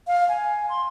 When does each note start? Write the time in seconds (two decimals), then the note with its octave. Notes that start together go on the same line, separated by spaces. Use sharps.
0.07 F5
0.29 G#5
0.69 C6